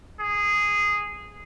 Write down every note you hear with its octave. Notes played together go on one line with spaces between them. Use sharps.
G#4